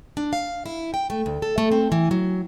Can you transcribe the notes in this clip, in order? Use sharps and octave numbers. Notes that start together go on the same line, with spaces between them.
D4
F5
E4
G5
A3
D2
A4
A3
C4
E3
F#3